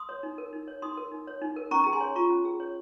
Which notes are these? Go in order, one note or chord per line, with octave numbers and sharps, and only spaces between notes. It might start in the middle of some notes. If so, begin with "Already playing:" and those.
Already playing: C6 D#6
C#5
D#4
A#4
D#4
C#5
D#4 C6 D#6
A#4
D#4
C#5
D#4
A#4
C#4 A#5 C#6
G#4 A#5
G#5 C6
C#5
F4 A#5 C#6
C#4
G#4
C#5